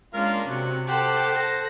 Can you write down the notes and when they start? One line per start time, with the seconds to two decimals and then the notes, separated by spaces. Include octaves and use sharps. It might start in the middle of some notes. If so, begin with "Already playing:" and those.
0.14 G#3 A#3 C#4 D4 F4 A#4
0.47 C3 F#3
0.87 G4 A4 C5 F#5 A5
1.35 A4 A#6